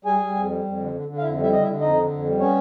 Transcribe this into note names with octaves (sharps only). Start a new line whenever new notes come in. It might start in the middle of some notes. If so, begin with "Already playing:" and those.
G3 G#4 G#5
G3
F2
G3
F2
D3
D3
D3
F5
F2 E4 E5
G3
E4 E5
D3 D#5
E4 E5
D3
F2 D#4 D#5
D3
F2
G3
B3 C#4 C#5